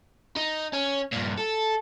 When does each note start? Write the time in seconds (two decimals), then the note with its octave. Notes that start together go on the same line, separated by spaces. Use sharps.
0.37 D#4
0.73 C#4
1.13 G2 A#2
1.38 A4